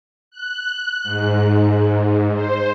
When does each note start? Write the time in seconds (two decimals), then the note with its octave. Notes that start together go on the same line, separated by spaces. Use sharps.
0.31 F#6
1.03 G#2
2.33 C5